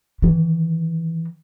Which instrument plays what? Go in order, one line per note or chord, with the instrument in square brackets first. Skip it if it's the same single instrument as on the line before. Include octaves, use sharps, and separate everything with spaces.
[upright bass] D#3 E3